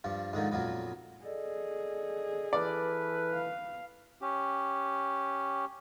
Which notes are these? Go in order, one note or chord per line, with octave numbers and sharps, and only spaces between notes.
G2 F3
G#2 D3 D#3 F3
F2 A#2 F#3 B3
G#4 A4 D5 D#5
E3 A4 B4 D5 F6
F5
C#4 G4